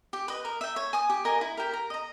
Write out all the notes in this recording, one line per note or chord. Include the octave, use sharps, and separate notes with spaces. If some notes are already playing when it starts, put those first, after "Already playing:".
G4
B4 D#5
A#4
E5 G5
C#5
G#5 D#6
G4
A#4 D#5 G#5
E4
G4 A#4
A#4
D#5 A#5